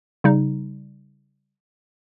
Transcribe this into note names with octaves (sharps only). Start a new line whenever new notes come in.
C#3 G3 D#4